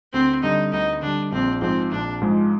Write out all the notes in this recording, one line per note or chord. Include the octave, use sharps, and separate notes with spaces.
D2 C4
D3 G3 D#4
D2 D#4
D3 G3 D4
A#1 C4
G#2 F3 G#3 C4
A#1 D4
G#2 F3 G#3